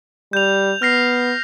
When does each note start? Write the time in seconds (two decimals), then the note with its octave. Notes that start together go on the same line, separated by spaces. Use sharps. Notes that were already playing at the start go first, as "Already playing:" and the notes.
0.33 G3 G6 F7
0.82 B3 F6 A#6 C7